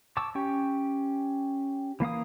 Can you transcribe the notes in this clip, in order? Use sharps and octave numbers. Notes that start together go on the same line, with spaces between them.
A5 C#6 D6 E6
C#4 G4 G5 C#6
E3 A#3 F5 D#6